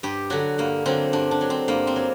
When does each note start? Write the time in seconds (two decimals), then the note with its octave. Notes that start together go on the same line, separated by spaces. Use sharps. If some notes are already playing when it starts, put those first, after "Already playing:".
0.03 G2 G4
0.30 D3 F#3 F#4
0.58 G2 A#3
0.86 D3 F#3 C4
1.13 G2 D4
1.31 D4
1.41 F#3
1.50 C4
1.68 G2 A#3
1.87 C4
1.96 F#3